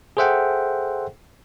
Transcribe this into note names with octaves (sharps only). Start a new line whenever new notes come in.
G#4 A4 C5 E5 F#5 G5